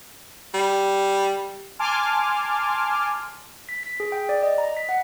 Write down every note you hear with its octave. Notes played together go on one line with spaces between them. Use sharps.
G3
G#5 A5 C6 D6 F6
B6
B6
G#4
G5
D5
D#5
A#5
B6
F#5